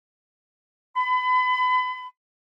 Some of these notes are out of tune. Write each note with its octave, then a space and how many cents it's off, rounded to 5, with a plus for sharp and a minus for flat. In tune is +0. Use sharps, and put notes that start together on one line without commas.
B5 +35